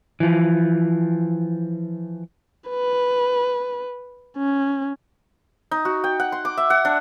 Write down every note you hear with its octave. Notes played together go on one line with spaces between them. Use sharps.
E3 F3
B4
C#4
D#4
F#4
G5
F#5
C6
D6
E5
F#5
D4